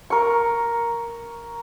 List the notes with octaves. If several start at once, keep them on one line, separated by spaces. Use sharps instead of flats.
A#4 C#6